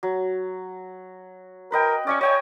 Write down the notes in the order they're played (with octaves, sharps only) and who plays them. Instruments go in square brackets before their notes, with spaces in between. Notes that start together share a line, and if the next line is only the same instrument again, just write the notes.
[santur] F#3
[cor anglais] A#4 [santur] B4 D#5 G5
[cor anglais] C#4 [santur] D5 D#5 C#6
[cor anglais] C#5 [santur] D#5 G5 G#5